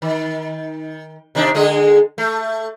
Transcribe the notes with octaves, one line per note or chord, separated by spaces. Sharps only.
D#3
C3 D#3 D4
D3 G#3 G#4
A3